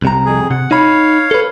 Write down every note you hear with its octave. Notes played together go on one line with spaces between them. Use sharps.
C2 C3 A#5
F2 G#4
C3 F#5
D#4 C#5 F5 B5
A4 B4